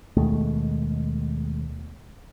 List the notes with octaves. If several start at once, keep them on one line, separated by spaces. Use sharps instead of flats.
D#2 B2 G#3 A3